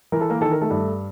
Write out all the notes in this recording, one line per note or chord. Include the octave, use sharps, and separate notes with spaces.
E3 A#4
A4
A#3 A#4
D#3 A4
A#4
A3 A4
G2